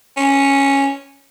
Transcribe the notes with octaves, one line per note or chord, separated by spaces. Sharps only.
C#4